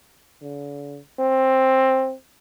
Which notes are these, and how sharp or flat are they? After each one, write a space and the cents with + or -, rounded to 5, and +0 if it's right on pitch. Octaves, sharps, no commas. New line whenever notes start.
D3 -45
C4 +10